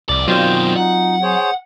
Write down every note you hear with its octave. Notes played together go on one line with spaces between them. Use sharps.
C2 F2 D5
B2 D#3 F#3 C4 F4 C5 D5 G5
D#4 F#5
G#4 C5 C#5